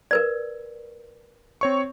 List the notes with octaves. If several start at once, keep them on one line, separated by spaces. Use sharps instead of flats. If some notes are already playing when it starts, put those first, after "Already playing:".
A#4 B4 D5
C4 C#5 C#6